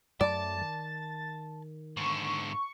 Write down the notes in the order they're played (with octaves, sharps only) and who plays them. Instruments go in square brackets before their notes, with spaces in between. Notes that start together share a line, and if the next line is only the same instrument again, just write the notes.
[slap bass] F#2 F#3 A3 [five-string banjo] D5 [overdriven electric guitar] A5 [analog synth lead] A6
[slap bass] D#3
[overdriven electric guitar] G#2 D3 [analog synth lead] C#6